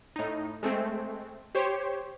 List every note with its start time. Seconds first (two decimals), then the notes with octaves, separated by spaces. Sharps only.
0.16 A2 D#4
0.63 G#3 A3 C4
1.55 G4 C5 C#5